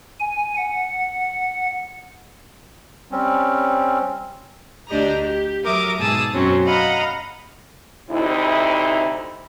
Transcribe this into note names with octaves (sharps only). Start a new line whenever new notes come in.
G#5
F#5
G3 C4 C#4
D2 D4 G4 D#5 A#5
G4
F#3 A#4 E5 D6 D#6
G#2 B2 G#4 A5 D#6 E6
F#2 B2 F#3 C4 C#4
D#5 F5 F#5 A#5 B5 F6
D2 C3 D#4 E4